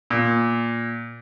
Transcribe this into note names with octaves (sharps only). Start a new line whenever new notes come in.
A#2